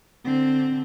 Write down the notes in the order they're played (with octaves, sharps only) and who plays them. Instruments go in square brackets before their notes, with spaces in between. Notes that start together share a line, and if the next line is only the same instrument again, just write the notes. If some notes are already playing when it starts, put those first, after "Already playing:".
[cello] D3 C4